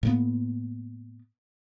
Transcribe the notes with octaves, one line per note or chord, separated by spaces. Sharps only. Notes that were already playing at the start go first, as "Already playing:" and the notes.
A2 A#3 B3